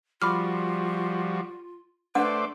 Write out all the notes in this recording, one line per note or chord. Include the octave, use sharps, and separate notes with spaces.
F3 G3 F4 F#4 B5 D6 F6
A3 D4 B4 C5 D5 F#5